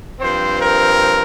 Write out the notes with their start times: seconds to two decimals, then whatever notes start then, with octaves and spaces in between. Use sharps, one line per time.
0.19 G2 F3 C4 C5
0.60 A#4